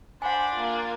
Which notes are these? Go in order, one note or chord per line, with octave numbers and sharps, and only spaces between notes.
D4 C5 F#5 G#5 B5
A#3 F4